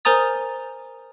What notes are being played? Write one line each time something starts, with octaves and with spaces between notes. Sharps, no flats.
A#4 C5 G#5 A#5 D#6 A6